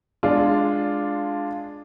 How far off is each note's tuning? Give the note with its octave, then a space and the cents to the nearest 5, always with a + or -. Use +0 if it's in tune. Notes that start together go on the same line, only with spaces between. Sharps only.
G#3 +0 D4 +0 F4 +0